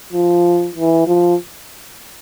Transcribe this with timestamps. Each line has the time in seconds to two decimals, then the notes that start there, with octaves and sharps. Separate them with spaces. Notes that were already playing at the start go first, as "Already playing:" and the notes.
0.13 F3
0.75 E3
1.07 F3